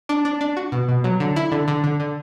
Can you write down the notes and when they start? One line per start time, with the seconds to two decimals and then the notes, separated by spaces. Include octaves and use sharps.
0.09 D4
0.25 D4
0.41 D4
0.57 F#4
0.72 B2
0.89 B2
1.04 F#3
1.20 D3
1.36 E4
1.52 D3
1.68 D3
1.84 D3
2.00 D3